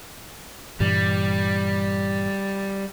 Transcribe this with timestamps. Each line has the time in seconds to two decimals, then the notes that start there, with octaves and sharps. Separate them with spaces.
0.80 G2 A#2 E3 G3